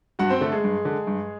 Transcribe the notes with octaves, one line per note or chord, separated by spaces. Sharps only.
G2 F#4 F#5
C4 C5
D3 A3 A4
G#3 G#4
G2
D3
G2